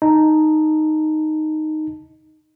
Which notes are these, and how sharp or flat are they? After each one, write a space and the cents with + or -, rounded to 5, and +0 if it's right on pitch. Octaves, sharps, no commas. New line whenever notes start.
D#4 -5 A5 +0